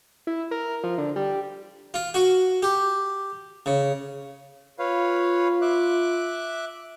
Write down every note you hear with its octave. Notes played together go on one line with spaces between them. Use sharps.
E4
A#4
F3
D3
G3
F4
F#4
G4
C#3
F4 B4 C#5 F5
E5 D6 F#6